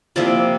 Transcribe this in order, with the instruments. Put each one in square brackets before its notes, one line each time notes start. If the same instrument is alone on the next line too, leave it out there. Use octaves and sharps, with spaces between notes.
[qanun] C3 F3 A#3 E4 D5